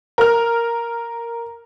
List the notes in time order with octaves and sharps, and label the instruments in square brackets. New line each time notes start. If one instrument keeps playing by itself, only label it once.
[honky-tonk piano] A#4 F6